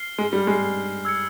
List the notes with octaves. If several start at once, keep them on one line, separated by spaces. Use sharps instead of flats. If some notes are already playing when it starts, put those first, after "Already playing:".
Already playing: F6 C7 G7
G#3
G3
G#3
E6 G#6 C#7